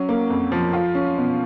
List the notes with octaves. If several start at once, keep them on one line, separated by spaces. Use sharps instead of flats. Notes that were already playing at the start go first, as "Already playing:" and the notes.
Already playing: F#3 C#4
A#3
F2
F3
F4
C#4
B2